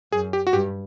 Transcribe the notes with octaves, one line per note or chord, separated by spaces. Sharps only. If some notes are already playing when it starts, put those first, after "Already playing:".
F#2 G#4
G4
F#4
G2 G4